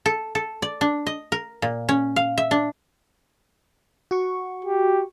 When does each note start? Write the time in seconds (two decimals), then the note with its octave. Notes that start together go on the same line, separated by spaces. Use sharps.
0.06 A4
0.35 A4
0.62 D5
0.81 D4
1.06 D#5
1.32 A#4
1.62 A#2
1.89 C#4
2.16 F5
2.38 E5
2.51 D4
4.11 F#4 C#6
4.65 G4